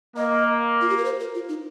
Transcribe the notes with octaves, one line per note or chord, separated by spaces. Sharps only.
A#3 D#5
F4
G4
A#4
C5
A#4
F4
D#4